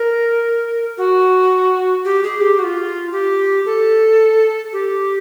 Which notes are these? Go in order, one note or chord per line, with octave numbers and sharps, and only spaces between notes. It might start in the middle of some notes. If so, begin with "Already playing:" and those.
Already playing: A#4
F#4
G4
G#4
G4
F#4
F4
G4
A4
G4